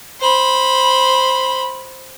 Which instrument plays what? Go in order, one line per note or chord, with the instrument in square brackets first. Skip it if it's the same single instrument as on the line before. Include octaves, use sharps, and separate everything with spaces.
[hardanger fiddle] C5 B5